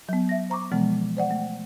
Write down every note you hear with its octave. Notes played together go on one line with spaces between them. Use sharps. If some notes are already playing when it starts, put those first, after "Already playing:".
F#3 B3
E5 A#6
C5 A#5 C#6 D6
B2 E3 F3 G#3 B3
C5 D5 F#5
A3